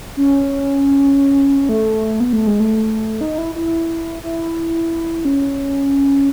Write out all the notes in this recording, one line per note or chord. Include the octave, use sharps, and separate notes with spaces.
C#4
A3
B3
A3
G#3
A3
D#4
E4
E4
E4
C#4